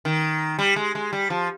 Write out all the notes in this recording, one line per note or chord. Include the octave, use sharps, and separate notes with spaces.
D#3
G3
G#3
G#3
G3
F3